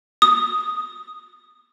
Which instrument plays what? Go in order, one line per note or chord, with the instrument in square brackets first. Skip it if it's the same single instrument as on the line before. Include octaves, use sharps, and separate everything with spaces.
[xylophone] D#6